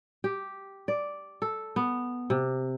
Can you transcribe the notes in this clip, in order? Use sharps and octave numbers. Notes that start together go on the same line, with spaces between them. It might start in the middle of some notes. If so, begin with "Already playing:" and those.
G4
D5
A4
B3
C3